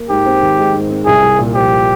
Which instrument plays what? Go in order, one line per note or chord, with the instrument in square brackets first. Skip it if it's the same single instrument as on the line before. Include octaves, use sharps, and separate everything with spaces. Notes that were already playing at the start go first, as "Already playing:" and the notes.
Already playing: [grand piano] A#3
[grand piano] G#2 [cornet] G4
[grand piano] C4
D#3
G#3
G#2
C4
[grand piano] C2 [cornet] G#4
[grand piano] C2
A#2
[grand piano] F3 [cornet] G4